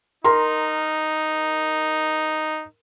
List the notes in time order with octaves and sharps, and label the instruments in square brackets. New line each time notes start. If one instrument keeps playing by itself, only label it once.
[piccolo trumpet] D#4 [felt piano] A#4 A#5 C6